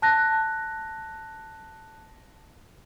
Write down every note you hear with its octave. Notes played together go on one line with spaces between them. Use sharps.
A5 F#6 A#6